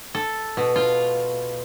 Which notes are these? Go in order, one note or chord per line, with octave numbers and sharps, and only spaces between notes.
A4
B2
F4